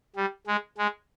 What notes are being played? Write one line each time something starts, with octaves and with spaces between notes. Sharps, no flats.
G3
G#3
G#3